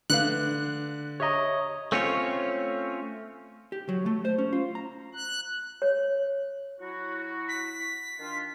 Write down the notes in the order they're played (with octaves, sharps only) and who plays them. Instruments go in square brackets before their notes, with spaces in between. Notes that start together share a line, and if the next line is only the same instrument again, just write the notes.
[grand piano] D3 [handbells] A3 B4 F5 [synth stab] F#6
[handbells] G4 E5 A#5 [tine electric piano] C#5 D#5
[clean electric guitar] A3 C4 C#4 F4 C#5
[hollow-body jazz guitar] G4
F#3
A3
C5
C#4
F4
A#5
[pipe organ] F#6
[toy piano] C#5
[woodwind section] F#3 E4 F#4
[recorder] B6
[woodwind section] D#3 D4 F4